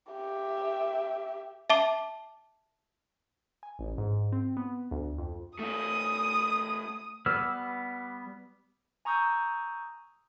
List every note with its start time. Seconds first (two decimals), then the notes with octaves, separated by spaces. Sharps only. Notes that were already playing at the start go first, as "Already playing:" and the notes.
0.12 G4 E5
1.70 E5 A5 D6
3.63 G#5
3.79 A1
3.98 G#2
4.32 C4
4.57 B3
4.91 D2
5.18 F2
5.59 A3 F4 D#6
7.26 G3 B3 B4 E6 F6
9.05 G#5 A#5 C#6 D#6 E6 G6